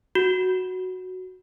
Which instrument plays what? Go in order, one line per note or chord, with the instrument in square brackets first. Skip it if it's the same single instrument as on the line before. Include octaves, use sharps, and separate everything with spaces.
[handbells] F#4